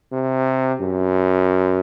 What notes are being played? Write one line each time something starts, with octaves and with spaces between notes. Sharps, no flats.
C3
F#2